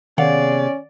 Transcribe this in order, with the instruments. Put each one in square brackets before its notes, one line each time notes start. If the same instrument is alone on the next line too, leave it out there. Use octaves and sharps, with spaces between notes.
[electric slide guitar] C3 B3 G#4 [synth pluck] D#3 F5 F#5 [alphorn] C#4 [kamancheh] D5